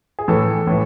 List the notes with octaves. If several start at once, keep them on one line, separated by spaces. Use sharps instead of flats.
G#4
A2 E3 A4
A2 E3